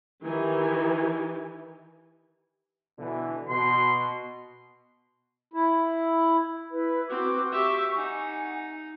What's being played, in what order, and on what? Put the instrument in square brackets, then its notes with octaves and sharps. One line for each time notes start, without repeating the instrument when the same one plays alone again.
[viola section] D#3 E3 G4 G#5
[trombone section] B2 D3 E3
[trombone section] B2 [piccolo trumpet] C6
[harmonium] E4
[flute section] E4 B4
[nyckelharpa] C4 [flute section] F#4 B4 D6
[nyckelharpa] G4 E5 [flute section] C#6 D6 G6
[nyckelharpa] D#4 [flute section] F#5 G#5